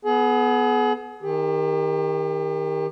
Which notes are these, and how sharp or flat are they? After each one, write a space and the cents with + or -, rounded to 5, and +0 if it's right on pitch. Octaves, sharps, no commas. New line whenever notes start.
B3 +0 G#4 +35
D#3 +5 G4 +35